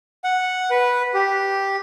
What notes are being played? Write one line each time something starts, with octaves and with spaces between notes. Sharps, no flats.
F#5
B4
G4